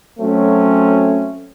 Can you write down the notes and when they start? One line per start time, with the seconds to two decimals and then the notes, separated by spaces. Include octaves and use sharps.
0.19 F#3 A3 C4 C#4